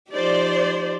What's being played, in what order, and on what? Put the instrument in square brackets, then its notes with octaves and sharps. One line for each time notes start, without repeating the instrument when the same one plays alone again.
[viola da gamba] F3 D#4 G4 [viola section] C5 D5